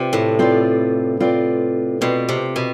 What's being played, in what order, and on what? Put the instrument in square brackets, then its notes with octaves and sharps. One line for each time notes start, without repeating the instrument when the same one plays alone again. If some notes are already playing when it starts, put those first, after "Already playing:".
Already playing: [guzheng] C3 [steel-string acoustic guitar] C4 F4 B4 D5
[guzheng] A2
[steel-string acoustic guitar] C4 F4 B4 D5
C4 F4 B4 D5
[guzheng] B2 [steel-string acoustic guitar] C4 F4 B4 D5
[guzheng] C3
B2